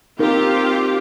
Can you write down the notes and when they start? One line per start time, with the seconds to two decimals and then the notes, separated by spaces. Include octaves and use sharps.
0.19 C4 D#4 F4 G4 A#4